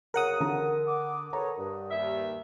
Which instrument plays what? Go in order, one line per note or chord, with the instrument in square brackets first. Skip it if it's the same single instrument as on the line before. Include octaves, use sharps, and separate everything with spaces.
[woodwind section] C2 F#2 C#3 [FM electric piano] A#4 F#5 D#6
[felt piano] D3 A#5
[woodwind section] D6
[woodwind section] A4 B4 C#5 [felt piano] A#5
[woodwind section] G2
[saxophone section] D#2 E5